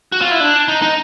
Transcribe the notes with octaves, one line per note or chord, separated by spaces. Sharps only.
F#4
F4
E4
D4
D#4
D#4